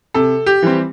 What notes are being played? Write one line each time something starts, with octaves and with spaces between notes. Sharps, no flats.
C3 A4
G4
E3 G3 C4